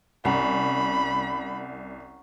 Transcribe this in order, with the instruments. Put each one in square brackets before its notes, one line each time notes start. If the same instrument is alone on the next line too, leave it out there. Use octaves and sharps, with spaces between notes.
[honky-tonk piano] C2 [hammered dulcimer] C#4 F#5 A#5 [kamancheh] B5